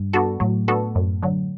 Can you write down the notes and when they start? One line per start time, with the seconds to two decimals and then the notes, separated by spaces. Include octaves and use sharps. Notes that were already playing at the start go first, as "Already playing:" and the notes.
Already playing: G2
0.13 B3 D4 F#4 A4
0.40 A2 F#3
0.68 B3 D4 F#4 A4
0.95 F#2
1.23 D3 F#3